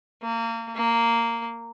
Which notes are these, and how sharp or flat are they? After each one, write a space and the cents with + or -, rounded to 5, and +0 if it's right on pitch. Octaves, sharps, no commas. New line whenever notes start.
A#3 -30
A#3 -10